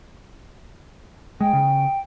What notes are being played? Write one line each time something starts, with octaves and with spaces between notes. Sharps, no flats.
G#3 G5
C#3